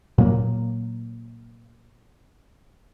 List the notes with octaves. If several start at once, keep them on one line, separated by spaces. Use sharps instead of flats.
A#2 F#3 A#3